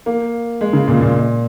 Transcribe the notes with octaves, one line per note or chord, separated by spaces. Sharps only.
A#3
G#3
C#3
A#2
A#2